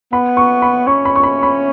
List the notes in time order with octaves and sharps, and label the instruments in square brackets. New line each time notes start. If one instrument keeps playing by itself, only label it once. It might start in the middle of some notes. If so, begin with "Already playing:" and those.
[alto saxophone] B3 [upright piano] B5
[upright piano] C#6
B5
[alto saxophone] C#4 [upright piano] C#6
[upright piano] B5
C#6
B5
B5